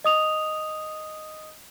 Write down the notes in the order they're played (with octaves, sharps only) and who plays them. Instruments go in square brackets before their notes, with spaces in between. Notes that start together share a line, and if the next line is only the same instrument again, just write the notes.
[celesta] D#5 D#6 F7